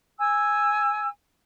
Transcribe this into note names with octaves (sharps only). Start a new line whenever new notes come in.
G#5 E6